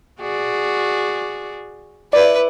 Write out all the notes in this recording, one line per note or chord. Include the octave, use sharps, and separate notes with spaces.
F#4 G#4 D5
E4 B4 D5